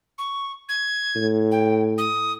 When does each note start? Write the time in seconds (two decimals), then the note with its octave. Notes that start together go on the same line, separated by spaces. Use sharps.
0.18 C#6
0.69 G#6
1.16 A2
1.51 G5
1.98 D#6